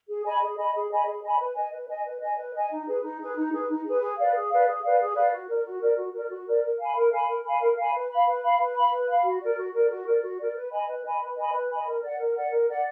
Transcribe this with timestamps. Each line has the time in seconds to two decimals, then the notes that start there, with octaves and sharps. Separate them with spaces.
0.09 G#4
0.25 D#5 G#5 B5
0.41 G#4
0.58 D#5 G#5 B5
0.74 G#4
0.91 D#5 G#5 B5
1.06 G#4
1.23 D#5 G#5 B5
1.39 B4
1.55 D#5 G#5
1.72 B4
1.89 D#5 G#5
2.05 B4
2.21 D#5 G#5
2.37 B4
2.54 D#5 G#5
2.71 D#4
2.87 G#4 B4
3.03 D#4
3.19 G#4 B4
3.36 D#4
3.52 G#4 B4
3.68 D#4
3.85 G#4 B4
4.01 G#4
4.17 B4 D5 F5
4.34 G#4
4.50 B4 D5 F5
4.67 G#4
4.83 B4 D5 F5
4.99 G#4
5.15 B4 D5 F5
5.32 F#4
5.48 A#4 D5
5.64 F#4
5.81 A#4 D5
5.97 F#4
6.14 A#4 D5
6.30 F#4
6.46 A#4 D5
6.63 A#4
6.79 F5 G#5 B5
6.96 A#4
7.12 F5 G#5 B5
7.28 A#4
7.44 F5 G#5 B5
7.61 A#4
7.77 F5 G#5 B5
7.94 B4
8.10 F5 B5
8.26 B4
8.42 F5 B5
8.60 B4
8.76 F5 B5
8.92 B4
9.08 F5 B5
9.24 F#4
9.41 A#4 D5
9.58 F#4
9.74 A#4 D5
9.90 F#4
10.06 A#4 D5
10.23 F#4
10.39 A#4 D5
10.55 B4
10.72 D#5 G#5 B5
10.88 B4
11.04 D#5 G#5 B5
11.21 B4
11.37 D#5 G#5 B5
11.53 B4
11.70 D#5 G#5 B5
11.87 A#4
12.02 D5 F#5
12.19 A#4
12.36 D5 F#5
12.51 A#4
12.69 D5 F#5